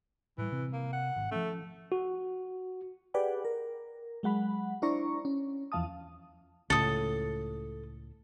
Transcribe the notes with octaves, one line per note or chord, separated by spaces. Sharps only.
A2 E3 G3
C3 C4
A#3
F#5
G#1
F3 A3 C#4
F#4
G4 G#4 B4 D5 F#5 G5
A#4
F#3 G#3 F#5 B5
D4 E4 C5 D5 A#5 C#6
C#4
E2 E3 F3 F5 A5 D#6
C#2 A2 A4 D#6